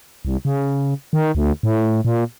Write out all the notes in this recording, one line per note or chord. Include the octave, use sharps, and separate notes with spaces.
C2
C#3
D#3
D2
A2
A#2